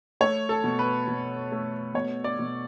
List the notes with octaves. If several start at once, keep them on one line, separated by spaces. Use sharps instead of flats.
A3 C#5
A4
B2
B4
B2
A3
B2 C#5
D5
B2